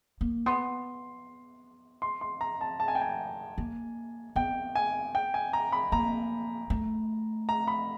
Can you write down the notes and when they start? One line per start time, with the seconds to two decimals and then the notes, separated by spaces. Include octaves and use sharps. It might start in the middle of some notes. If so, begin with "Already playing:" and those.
0.21 A#3
0.46 B3 C6
2.02 C6
2.21 C6
2.41 A#5
2.61 A5
2.80 A5
2.88 G#5
2.95 G5
3.02 G#5
3.58 A#3
4.36 B3 G5
4.75 G#5
5.15 G5
5.34 G#5
5.53 A#5
5.72 B5
5.92 A#3 A#5
6.70 A3
7.49 A#5
7.68 B5